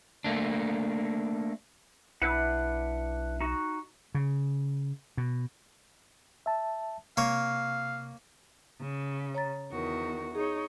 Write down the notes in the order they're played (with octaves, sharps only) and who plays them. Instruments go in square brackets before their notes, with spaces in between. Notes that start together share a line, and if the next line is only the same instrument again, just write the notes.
[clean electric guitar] A3 A#3 D4
[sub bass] B1 [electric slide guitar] D4 B4 F#5 [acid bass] E4
[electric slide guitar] D#4 F#4
[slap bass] C#3
B2
[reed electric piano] E5 A5
[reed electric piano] C3 C#6 [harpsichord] A#3 C#5 [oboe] F5
[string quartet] C#3
[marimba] C#5 A#5 A6
[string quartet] E2 D#3 F#4
[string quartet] D#4 C#5 [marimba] G#4